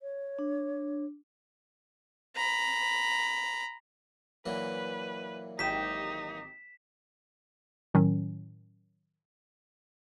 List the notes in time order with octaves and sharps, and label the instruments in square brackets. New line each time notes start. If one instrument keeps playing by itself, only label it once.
[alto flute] C#5
[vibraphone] D4
[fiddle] A#5 B5
[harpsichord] A#2 E3 F#3 [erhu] B4
[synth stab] G#1 G4 [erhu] D#4 [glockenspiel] B6 E7
[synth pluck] A2 D#3 F#3 C#4